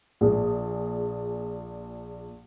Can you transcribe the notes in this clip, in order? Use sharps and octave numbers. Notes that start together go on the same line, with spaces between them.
A#1 G#4